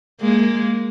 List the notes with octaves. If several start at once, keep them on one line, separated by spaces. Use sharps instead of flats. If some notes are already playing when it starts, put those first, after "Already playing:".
G#3 A#3